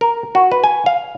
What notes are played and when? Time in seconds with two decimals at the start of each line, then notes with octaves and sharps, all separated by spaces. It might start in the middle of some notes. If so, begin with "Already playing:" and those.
0.01 A#4
0.35 F#4
0.52 B4
0.64 G#5
0.86 F5